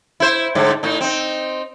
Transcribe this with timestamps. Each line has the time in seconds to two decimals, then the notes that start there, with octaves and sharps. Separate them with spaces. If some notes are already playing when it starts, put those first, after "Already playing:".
0.20 E4 C5
0.55 G#2 D3 G3
0.83 A2 D#4
1.01 C4 D#4